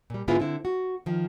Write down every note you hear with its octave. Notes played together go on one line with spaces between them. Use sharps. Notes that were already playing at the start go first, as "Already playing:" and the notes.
A#2 G3
G#2 D3 G#3 B3 E4 F4
D3 C4 E4
F#4
D#3 F3